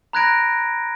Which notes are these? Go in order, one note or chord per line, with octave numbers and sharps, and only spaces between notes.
A#5 B5 F#6 G#6 A#6 D7